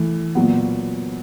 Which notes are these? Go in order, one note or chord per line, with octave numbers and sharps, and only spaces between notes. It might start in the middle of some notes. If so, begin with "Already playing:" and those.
Already playing: E3 A3
A#2 F#3 B3